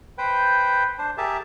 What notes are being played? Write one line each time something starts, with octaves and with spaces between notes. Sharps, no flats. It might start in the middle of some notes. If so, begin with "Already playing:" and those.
B4 C5 G5
D4 C5
G4 G#4 A#4 E5 A5